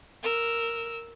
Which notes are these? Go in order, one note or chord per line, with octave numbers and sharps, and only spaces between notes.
A#4 E6